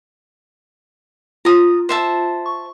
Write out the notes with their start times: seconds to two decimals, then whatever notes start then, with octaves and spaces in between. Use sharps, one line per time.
1.45 F4 A#5 D#6
1.89 C5 E5 A5
2.46 C#6